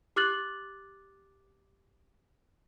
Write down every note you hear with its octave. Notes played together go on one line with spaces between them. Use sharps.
G4 D6 F6 F#6 A6 F#7